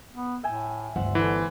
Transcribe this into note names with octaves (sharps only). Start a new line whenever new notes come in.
B3
A2 E5 G5 G#5
G1 D2 C5 E5 F#5
D3 E3